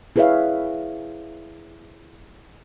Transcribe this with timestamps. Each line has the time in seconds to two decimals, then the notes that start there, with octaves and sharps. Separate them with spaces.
0.16 E4 G#4 B4 C#5 E5 F5